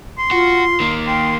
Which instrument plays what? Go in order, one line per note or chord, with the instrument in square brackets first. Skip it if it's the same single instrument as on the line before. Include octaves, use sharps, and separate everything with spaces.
[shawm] C6
[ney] F4 [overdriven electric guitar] F#4
[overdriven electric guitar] D#3 A#3
[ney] G5 [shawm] C6